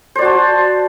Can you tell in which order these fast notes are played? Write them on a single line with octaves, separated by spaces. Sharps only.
C5 D5 F#4 A5